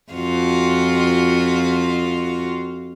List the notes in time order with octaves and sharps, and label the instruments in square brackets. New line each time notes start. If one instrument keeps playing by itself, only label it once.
[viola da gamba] F2 F4 F#4